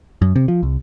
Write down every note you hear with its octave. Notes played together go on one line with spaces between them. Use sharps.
F#2
C3
F3
C2